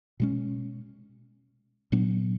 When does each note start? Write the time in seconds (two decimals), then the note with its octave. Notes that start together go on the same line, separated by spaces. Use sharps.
0.20 B2 G#3 C#4
1.92 A#2 F#3 B3 D4